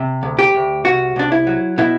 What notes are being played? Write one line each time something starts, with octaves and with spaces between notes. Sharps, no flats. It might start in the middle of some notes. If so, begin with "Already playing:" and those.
Already playing: C3
D2
G4
D2
C2 F#4
C2 D4
E4
F#3
B2 E4